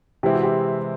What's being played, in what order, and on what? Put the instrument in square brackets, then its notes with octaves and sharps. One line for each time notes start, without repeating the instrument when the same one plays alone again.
[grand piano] C3 E3 G#3 C4 E4 [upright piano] G4
[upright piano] F#4
G4